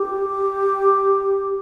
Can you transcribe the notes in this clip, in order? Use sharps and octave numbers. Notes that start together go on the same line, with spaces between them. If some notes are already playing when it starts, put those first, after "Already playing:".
Already playing: G4